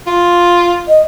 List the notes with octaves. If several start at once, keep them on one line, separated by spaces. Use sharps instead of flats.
F4
D#5